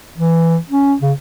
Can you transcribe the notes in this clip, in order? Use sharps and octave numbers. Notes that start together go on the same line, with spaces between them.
E3
C#4
C#3